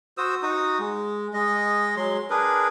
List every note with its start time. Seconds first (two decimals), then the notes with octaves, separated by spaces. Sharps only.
0.18 F#4 C5 D#6 E6
0.43 D#4 F#4 D#6
0.79 G#3
1.34 G#3 D#5
1.97 F#3 G#3 C6
2.30 D4 G#4 A#4 B4